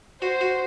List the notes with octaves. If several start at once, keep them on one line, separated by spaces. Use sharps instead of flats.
F#4 C5
F#4